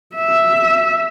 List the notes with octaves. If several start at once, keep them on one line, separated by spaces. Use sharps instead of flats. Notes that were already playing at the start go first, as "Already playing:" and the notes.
E5